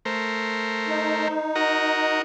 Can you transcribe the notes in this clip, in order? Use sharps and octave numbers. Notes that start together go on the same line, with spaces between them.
A3 A#4 C5
D#4
F#4 A#4 D#5